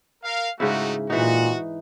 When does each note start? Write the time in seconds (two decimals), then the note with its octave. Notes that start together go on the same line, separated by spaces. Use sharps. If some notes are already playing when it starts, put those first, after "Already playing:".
0.24 A#4 F5
0.60 G#2 C#3 A3 D#4 E4 F#4
1.10 A#2 E3 D#4 F#4